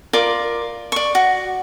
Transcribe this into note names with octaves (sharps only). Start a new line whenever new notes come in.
F4 A#4 D5 D6
D5 C#6
F#4